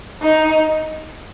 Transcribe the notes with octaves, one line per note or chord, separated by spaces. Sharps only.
D#4